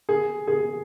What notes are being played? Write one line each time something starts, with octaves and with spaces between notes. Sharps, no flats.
G#4
G#4